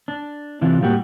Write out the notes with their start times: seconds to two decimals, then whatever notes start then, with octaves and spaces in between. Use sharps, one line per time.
0.08 D4
0.61 C3 E3 D4 F4
0.82 A2 G3 A#3 F#4 G4